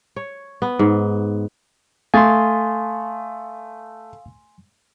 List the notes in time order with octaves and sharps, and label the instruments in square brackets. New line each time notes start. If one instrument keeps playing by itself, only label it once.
[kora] C#5
B3
G#2
[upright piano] A3 [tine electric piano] F5 D#6 A6 [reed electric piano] G#5 C6